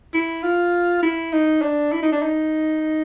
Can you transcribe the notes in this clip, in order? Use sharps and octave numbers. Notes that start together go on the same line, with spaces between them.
E4
F4
E4
D#4
D4
E4
D#4
D4
D#4